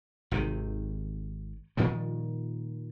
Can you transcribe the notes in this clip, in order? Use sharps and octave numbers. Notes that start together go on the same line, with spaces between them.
G#1 C3 D#3
A#2 D#3 F3 G3